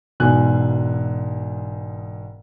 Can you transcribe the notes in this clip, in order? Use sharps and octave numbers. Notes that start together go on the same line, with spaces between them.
E1 G#2 B2 G#5 F#6